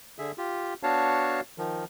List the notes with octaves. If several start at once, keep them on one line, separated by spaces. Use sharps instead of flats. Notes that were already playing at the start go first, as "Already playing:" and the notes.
D3 G#4 E5
F4 G4
B3 D4 F#4 C#5 F5 A5
D#3 F3